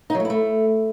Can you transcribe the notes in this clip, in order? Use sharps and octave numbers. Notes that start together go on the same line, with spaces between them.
D#4
F#3
A3
E4
A3